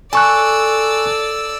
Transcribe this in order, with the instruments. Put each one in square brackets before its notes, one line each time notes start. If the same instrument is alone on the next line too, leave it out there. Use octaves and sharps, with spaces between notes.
[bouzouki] A4 [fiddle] D5 E6 [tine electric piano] G#5 C#6 F#6